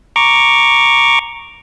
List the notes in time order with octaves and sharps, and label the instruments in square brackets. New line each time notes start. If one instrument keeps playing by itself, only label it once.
[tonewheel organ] A#5 C#6 D6